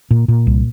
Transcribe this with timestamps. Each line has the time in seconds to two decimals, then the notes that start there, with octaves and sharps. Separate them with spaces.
0.11 A#2
0.28 A#2
0.47 C2